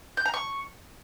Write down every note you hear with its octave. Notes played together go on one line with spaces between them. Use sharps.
G6
A#5
C#6